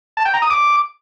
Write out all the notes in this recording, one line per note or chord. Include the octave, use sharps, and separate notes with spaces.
A5
G5
A#5
D#6
D6